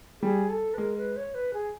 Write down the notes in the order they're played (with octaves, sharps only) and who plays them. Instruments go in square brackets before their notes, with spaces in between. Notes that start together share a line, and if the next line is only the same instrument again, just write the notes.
[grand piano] G3 [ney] G#4
[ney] A4
B4
[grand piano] G#3 [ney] A#4
[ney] B4
C#5
B4
G#4